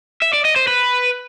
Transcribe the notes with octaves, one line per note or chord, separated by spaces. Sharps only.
E5
D5
D#5
C5
B4